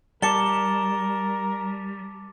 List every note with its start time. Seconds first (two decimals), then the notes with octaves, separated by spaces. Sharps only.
0.22 G3 A#4 A5 D6 C#7 G7